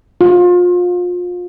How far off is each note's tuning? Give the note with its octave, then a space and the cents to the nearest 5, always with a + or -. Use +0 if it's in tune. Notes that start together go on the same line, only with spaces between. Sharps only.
F4 +30